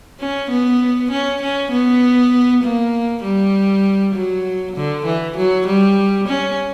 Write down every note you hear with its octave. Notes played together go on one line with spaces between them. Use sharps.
C#4
B3
C#4
C#4
B3
A#3
G3
F#3
D3
E3
F#3
G3
C#4